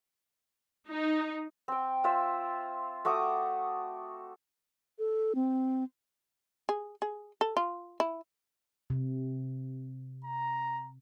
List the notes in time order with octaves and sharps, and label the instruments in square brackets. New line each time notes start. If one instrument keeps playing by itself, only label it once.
[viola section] D#4
[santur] C4 G5
F4 C5 E5
A3 F#4 D6 D#6
[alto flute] A4
C4
[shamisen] G#4
G#4
A4
F4
E4
[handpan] C3
[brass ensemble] A#5